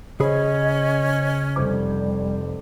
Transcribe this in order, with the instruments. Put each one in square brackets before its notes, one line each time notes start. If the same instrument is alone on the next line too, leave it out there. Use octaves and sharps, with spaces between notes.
[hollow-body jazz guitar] C#3 G#4 B5 [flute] C#4 [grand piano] C5 C#5 [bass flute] D#5
[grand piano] F1 C5 D6 [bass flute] G3